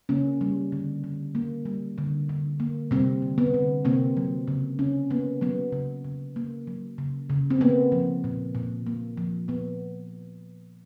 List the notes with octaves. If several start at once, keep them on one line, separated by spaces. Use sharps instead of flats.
C#3 A#3 C#4
G3
D3
D3
A#3
G3
D3
D3
A#3
C3 G3 C4
D3
B3
D3
C3 A#3 C4
F#3
C#3
C#3 C#4
A#3 B3
F#3 B3
C#3
C#3
A#3
F#3
C#3
C#3
C4
A#3 B3
F3
A#2
A#2
A#3
F3
A#2 B3